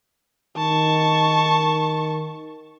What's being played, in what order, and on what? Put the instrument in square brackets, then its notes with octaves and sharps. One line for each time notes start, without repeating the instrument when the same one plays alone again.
[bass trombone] D#3 [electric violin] A5 C#6